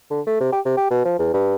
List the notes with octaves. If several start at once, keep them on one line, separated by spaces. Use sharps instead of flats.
D3
A3
C3
G4
C3
G4
B2
F3
E2
G2